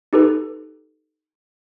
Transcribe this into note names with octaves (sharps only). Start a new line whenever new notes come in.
D#4 G4 A4 B4